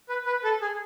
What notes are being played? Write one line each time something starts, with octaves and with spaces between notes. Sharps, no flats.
B4
B4
A4
G#4